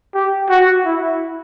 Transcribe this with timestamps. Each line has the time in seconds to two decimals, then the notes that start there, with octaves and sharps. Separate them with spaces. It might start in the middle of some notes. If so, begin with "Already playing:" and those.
0.14 G4
0.50 F#4
0.85 E4